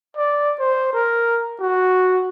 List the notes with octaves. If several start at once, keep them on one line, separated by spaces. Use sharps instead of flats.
D5
C5
A#4
F#4